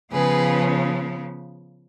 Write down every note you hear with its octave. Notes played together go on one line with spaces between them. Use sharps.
C#3 F3 B3 G#4 B4